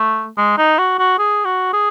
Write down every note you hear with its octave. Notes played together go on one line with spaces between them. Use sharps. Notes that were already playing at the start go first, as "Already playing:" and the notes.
Already playing: A3
G#3
D#4
F#4
F#4
G#4
F#4
G#4